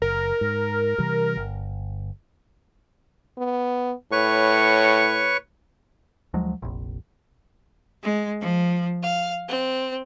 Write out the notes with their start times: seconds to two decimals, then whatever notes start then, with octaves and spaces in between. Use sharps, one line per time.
0.02 F#1 A#4
0.41 G#2
0.98 C3 E3 G3
1.37 G1
3.38 B3
4.12 A2 B4 C#5 C#6
6.34 D2 F3 F#3 G#3
6.62 F1 A#1
8.03 G#3
8.41 F3
9.02 F5
9.47 C4